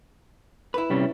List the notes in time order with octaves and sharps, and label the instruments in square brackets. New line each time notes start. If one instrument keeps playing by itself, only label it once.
[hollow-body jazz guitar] E4 B4
[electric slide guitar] C3 G3 C#4